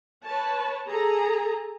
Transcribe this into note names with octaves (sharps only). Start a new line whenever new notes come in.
B4 C#5 A5
G#4 A4 A#5